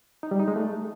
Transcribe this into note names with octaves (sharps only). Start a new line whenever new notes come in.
D#4
G3
D#4
G#3
A3